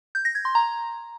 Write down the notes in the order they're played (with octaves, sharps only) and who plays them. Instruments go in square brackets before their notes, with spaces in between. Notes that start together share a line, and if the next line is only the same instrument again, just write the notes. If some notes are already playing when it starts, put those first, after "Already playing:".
[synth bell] G6
A#6
G#6
C6
A#5